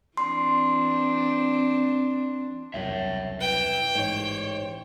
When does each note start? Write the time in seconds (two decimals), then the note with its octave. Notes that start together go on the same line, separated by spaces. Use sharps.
0.17 E3 C4 D4 C6
2.74 E1 C2 F#2 C#5 E5
3.41 B4 E5 G5
3.95 A1 G#2 C5 C#5